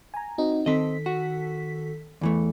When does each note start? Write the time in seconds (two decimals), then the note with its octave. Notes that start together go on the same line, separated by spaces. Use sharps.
0.14 G#5 A#5
0.38 C4 D#4 F#4
0.66 D#3 C4 A4 D#5 B6
1.06 F#4
2.21 E2 E3 A3